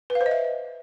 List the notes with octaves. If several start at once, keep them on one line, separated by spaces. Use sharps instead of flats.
B4
F5
C5
D#5
E5